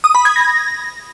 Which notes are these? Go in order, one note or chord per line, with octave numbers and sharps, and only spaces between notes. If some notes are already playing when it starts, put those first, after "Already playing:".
D#6
B5
G#6
A#6